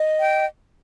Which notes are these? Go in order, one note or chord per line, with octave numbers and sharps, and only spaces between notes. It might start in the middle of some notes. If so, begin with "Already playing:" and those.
Already playing: D#5
G5